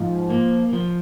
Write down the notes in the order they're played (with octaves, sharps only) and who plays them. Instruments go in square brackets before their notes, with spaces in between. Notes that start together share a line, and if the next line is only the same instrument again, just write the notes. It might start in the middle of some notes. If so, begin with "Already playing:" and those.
Already playing: [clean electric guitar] G#2 [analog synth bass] F3
[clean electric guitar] A#3
F3